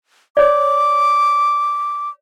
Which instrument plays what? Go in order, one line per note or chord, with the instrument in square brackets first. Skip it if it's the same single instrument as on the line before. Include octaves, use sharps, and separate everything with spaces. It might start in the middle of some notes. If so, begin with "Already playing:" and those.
[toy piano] C#5 D5 [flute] D6